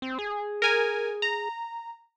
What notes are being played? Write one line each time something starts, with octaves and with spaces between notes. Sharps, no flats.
C4
G#4
A#4 G#5
A#5